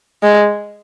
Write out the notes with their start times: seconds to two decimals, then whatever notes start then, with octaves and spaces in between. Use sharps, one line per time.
0.23 G#3